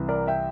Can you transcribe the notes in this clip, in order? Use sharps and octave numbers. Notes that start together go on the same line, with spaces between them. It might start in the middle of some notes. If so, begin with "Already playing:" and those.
Already playing: C2 C3 E3
A#4 D5
E5 G5